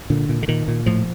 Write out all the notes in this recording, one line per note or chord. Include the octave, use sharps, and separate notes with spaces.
A#2 D3
A#2
D3
A#2 D#3
A#2
A2 F3